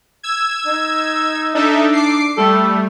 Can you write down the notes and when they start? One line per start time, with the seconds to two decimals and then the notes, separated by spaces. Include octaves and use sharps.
0.23 E6 G#6
0.66 D#4
1.55 D4 D#4 A4 E5
1.93 D6 C7
2.37 G3 A3 A4